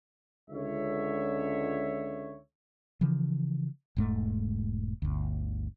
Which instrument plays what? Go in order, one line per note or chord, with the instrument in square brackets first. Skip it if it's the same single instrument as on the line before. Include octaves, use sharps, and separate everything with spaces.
[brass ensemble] C#2 D3 C#5 E5
[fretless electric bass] C#3 E3 F3
E1 G#2 A3
G1 D2